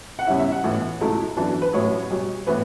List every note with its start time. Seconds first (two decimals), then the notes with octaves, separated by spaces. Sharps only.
0.19 F#5
0.27 E2 C#3 G3 C#4 E4 E5
0.39 E5
0.52 F#5
0.64 A2 E3 B3
1.01 C#2 B2 A3 E4
1.36 F#2 E3 B3 D4
1.62 B4
1.73 A1 A2 F#3 C#4 C#5
2.10 B1 B2 G3
2.46 A2 E3 B3 B4